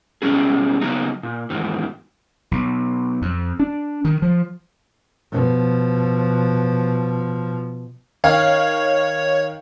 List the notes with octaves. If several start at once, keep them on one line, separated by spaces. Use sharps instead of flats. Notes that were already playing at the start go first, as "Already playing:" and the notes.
B2 D3 G3 C#4 G#4
C#3 F#3 B3 D#4
A#2
E2 G#2 D#3
B1
F2
D4
D#3
F3
B2 F3
D#3 C#5 F5